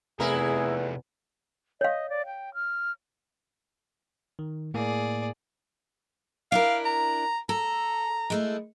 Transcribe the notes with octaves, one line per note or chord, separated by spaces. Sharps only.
E2 C3 A3 E4 G#4 A#4
C#5 D#5 F5
D5
G5
F6
D#3
A2 A#3 G#4 D5
D4 E4 A#4 F5
A#5
A4 A#5
G#3 A3 E4